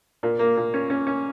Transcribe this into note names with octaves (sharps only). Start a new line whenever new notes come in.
A#2
A#3
A#2
C#4
C#4
C#4